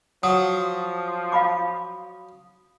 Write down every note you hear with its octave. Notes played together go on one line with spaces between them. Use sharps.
F3 F#3 D#6
F5 B5 D6